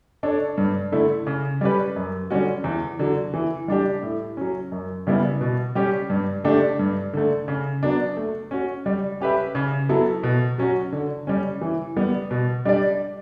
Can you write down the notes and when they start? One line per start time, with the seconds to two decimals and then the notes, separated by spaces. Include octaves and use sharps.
0.23 D4 A4 C#5
0.58 G2
0.92 D3 A3 E4
1.27 C#3
1.61 G3 C#4 G4 B4
1.96 F#2
2.30 D3 G3 C#4 F#4
2.64 E2
2.99 D3 F#3
3.34 E3
3.68 G3 D4 G4
4.03 A2
4.37 F#3 C#4
4.72 F#2
5.07 C#3 G3 B3 E4
5.41 B2
5.75 G3 C#4 G4
6.10 G2
6.44 D3 A3 D4 G4
6.79 G2
7.13 D3 A3
7.48 C#3
7.83 F#3 B3 D4
8.17 A3
8.51 C#4 F#4
8.86 G3
9.20 C#4 G4 B4 E5
9.55 C#3
9.89 F#3 B3 E4 A4
10.23 B2
10.58 F#3 C#4 F#4
10.92 D3
11.27 G3 C#4
11.61 E3
11.96 G3 B3
12.31 B2
12.65 G3 D4 G4 D5